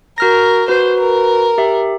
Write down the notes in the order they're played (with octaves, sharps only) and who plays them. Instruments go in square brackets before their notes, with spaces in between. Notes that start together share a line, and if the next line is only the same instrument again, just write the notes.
[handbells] F#4 F6 A#6 [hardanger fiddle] A#4
[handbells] F#4 B4 [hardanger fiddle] C5
[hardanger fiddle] A#4
[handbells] G4 E5